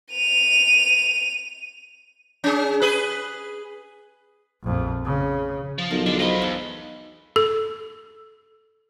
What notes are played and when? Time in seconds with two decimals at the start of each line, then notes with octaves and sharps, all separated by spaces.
0.12 D#7 F7
2.44 C#4 G#4
2.82 G#4 B4
4.63 A#1 F2
5.05 C#3
5.78 F3
5.91 B1 A#4
6.06 G#3 D4 F4 A4
6.19 F#3 C5 D#5 F5 B5
6.41 E2 D#4 B4 A5
7.36 A4